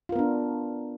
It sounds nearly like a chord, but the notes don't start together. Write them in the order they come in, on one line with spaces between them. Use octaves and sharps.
F4 A#4 B3 D4